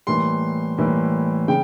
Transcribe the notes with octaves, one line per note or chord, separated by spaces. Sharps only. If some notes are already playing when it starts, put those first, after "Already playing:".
A2 E3 G3 A#3 C6
A2 E3 G3 A#3
C#3 G5